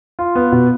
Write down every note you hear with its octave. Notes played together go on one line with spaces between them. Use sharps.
F4
B3
B2